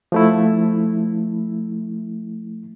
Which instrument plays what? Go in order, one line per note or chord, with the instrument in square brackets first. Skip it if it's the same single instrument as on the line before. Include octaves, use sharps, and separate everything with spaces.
[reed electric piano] F3 A3 E4